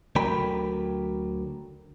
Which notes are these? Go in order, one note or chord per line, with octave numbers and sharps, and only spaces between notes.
D2 D3 F#3 A#4 G5 B5